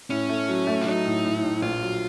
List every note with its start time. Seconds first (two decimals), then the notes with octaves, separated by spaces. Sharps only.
0.10 A2 C#4
0.29 A3
0.48 F#3
0.67 A3
0.81 F4
0.86 F#3 D#4
1.05 A2
1.24 A2
1.43 A2
1.62 A#1 F4
1.82 F#3